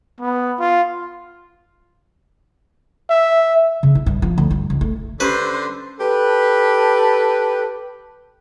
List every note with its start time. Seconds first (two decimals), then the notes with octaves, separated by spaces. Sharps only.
0.20 B3
0.60 F4
3.10 E5
3.83 C#3
3.95 E4
4.06 G2
4.22 F3
4.38 D2
4.51 G2
4.70 C#2
4.81 A3
5.20 D3 C#4 G4 B4 C5
5.99 G4 A4 B4